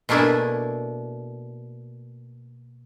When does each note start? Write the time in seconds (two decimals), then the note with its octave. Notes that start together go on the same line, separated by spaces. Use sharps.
0.09 B2 A3 A#3 D4 E4 G#4